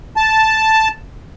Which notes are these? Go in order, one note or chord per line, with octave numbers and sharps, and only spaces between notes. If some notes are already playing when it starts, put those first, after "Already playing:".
A5